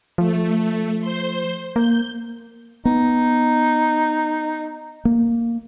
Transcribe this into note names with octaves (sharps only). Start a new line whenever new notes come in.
F3 A3
C5 C6
A#3 G6
B3 D#4
A#3